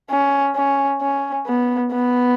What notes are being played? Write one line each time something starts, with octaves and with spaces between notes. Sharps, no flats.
C#4
C#4
C#4
B3
B3